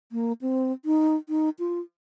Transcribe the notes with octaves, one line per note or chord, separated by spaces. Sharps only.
A#3
C4
D#4
D#4
F4